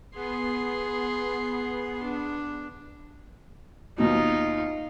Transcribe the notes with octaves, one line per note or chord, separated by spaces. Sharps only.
B3 G#4 C6
D4
D#2 B2 D#4 F4 F#4